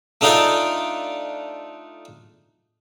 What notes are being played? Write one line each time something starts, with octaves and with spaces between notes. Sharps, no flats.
A3 D4 D#4 F4 A4 D5